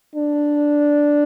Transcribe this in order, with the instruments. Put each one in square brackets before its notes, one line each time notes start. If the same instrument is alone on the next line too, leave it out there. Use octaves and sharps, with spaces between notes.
[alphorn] D4